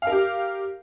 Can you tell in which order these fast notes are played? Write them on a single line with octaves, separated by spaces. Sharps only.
F5 A#4 G4